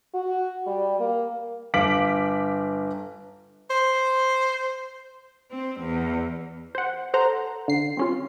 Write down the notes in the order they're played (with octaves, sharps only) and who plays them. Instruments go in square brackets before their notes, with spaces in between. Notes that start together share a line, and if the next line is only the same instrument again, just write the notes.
[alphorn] F#4
G3
A#3
[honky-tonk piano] G1 F5 D6 B6 D7 F#7
[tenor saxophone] C5
[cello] C4
E2
[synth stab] C5 F#5
A4 C5 F#5 A#5
D3 C7
C4 C#4 F4